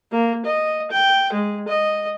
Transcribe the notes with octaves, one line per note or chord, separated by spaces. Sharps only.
A#3
D#5
G5
G#3
D#5